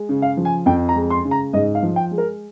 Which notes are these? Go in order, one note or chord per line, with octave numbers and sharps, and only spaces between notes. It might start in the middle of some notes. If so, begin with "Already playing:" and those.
Already playing: G#3
C#3
F5
F3
G#5
F2 G5
A#5
G#3
C6
C#3
A#5
G#2 D#5
F5
F3
G5
G#3
A#4